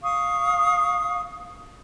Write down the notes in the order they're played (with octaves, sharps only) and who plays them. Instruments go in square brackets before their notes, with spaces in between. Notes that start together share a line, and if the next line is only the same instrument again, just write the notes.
[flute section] F5 C#6 D#6